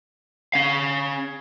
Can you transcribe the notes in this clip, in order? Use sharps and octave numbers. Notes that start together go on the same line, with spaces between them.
C#4 F5